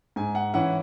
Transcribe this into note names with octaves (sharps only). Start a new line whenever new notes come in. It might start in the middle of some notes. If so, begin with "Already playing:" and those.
G#2 G#5
F#5
E3 C#4 E4 F#5